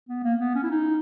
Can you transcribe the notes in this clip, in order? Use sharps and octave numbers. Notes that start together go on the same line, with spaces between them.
B3
A#3
B3
C#4
E4
D#4